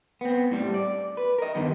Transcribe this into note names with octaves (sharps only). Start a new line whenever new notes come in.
B3 C4
A2 G3
D5
B4
A#4 D#5
E2 G2 D3 D#3 G3 B3